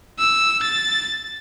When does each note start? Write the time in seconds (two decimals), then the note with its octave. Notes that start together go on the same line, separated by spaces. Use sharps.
0.19 E6
0.63 A6